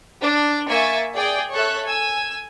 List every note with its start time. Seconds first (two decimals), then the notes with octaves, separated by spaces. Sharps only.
0.22 D4
0.67 A#3 E5 G#5 C#6 A6
1.14 G#4 D5 G5
1.53 A4 C#5 E5 F#6
1.86 G#5 E6